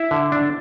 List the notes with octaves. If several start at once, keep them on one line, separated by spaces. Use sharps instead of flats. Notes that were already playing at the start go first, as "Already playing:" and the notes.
Already playing: E4 E5
D3
D4